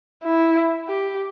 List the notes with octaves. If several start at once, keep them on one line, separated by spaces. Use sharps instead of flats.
E4
G4